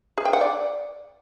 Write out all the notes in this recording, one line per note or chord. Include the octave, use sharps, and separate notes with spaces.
G#4
G5
F#5
D5